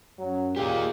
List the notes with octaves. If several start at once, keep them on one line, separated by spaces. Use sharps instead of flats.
F#2 F#3
A#2 A#3 G4 G#4